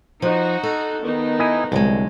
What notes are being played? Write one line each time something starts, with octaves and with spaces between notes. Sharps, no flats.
F3 D#4 F#4
A4
D#3 B3 D#4
E4 D#5 G#5
C2 D3 F#3 G#3